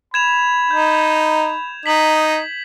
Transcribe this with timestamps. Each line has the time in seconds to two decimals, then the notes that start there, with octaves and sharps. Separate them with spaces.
0.14 B5 G#6 E7 F7
0.71 D#4 G6
1.86 D#4 D#5 B6 F#7